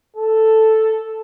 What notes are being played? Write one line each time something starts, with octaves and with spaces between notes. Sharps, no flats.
A4